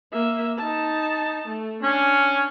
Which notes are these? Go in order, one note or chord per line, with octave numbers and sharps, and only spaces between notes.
A#3 E5
D#4 A5
A3
C#4 D4